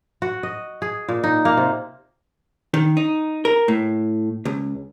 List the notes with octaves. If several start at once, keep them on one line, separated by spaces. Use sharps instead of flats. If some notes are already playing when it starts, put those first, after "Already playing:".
F#4
D#5
G#4
A#2
D#4
A#3
C3
D#3
D#4
A#4
A2
C#2